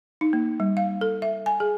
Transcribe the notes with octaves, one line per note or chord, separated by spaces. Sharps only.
D#4
A#3
G3
F5
A4
E5
G#5
G#4